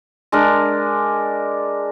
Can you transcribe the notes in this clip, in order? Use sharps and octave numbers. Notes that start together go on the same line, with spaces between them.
G#3 D4 A#4